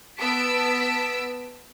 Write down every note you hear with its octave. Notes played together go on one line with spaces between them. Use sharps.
B3 A5 E6 B6 D7